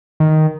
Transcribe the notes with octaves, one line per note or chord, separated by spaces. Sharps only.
D#3